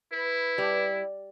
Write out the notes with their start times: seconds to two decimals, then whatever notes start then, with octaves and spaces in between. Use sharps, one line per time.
0.12 E4 B4
0.58 G3